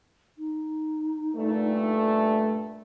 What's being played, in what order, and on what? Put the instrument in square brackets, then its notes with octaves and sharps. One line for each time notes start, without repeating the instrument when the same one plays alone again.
[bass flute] D#4
[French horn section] G2 A#2 A3